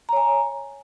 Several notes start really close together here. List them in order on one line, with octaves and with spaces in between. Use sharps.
A#5 C#5 G#5